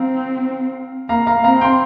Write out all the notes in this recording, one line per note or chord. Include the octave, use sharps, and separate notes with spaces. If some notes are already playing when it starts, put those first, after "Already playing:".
Already playing: C4 F5 A#5
A#3 F5 A#5
F5 A#5
C4 F5 A#5
G5 C6